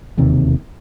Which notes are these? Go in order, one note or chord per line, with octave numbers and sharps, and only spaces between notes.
E1 D#2 C3 D#3